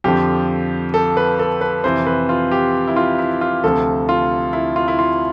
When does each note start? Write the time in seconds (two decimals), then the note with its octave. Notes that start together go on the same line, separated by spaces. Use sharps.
0.04 F2 D3 F3 G4
0.94 A4
1.17 B4
1.39 A4
1.61 B4
1.84 F2 C3 E3 C5
2.07 B4
2.29 F4
2.51 G4
2.87 E4
2.96 F4
3.19 E4
3.41 F4
3.64 D2 C3 F3 A4
4.09 F4
4.53 E4
4.76 F4
4.88 E4
4.99 F4